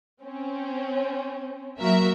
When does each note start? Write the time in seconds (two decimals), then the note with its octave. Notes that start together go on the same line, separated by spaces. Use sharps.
0.24 C4 C#4
1.80 F#3 A#3 F#4 A#4 E5